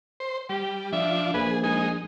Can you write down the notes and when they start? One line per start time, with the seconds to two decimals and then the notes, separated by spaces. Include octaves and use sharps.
0.20 C5
0.49 G3 G4
0.93 F3 D4 E5
1.34 A#1 G#4 B4
1.63 G#3 D#4 G#5